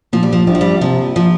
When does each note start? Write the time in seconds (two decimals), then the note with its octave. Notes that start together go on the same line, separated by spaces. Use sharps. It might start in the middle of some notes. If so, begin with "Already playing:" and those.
0.13 A#2 F3
0.23 G3
0.33 F3
0.47 A#1 G3
0.55 F3
0.61 G3
0.81 C3 F3
1.16 F3